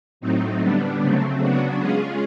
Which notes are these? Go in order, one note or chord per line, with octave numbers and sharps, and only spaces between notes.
A2 F#3 A3 C4 D#4
D3 G3 B3 D4
C#3 F#3 A3 C4
C#3 F#3 B3 D4 F#4
G#3 C#4 F4 G#4